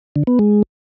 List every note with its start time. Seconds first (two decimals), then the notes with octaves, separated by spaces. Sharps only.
0.16 D3
0.27 B3
0.39 G#3